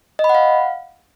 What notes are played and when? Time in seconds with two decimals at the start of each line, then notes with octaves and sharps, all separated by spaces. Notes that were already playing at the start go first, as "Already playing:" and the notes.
0.19 D#5
0.24 B5
0.29 F#5
0.35 F5